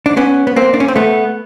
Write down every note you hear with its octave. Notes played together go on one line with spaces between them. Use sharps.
D4
B3 C#4
B3
A#3 C4
D4
C#4
C4
A3 B3